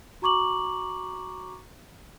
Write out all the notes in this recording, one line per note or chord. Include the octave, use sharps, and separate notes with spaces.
F#4 A#5 C#6 D6 F#7